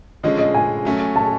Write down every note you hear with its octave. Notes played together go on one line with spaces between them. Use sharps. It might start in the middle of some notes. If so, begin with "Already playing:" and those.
D3 F3 G#3 C#4 D#5
D#5
G#5
F#3 A3 C#4
A5